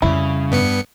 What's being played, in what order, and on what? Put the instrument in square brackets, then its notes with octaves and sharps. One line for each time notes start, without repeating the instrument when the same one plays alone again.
[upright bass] F2 G3 [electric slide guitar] C#3 [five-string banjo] E4
[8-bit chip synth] G2 B3 C#7